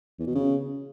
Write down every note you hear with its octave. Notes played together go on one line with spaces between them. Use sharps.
E2
B2
C#3